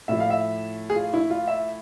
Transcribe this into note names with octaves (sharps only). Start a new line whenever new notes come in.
A2 F3 E5
F5
E5
G#4
F4
E4
F4
E5